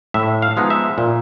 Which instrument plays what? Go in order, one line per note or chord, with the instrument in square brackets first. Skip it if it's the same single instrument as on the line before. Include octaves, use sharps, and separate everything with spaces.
[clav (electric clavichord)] A2 E5
F5
F3 G#3 B3 D#4
E5
A#2